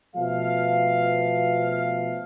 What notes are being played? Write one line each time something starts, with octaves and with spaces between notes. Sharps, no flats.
B2 F3 A3 B3 F5